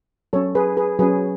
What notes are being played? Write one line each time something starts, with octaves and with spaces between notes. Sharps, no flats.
F#3 C#4 A4 C#5
G#4 B4
G#4 B4
F#3 C#4 G#4 B4